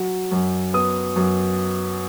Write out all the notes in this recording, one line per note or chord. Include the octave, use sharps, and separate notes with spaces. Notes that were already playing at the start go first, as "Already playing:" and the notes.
Already playing: F#3
F#2
B3 D#6
F#2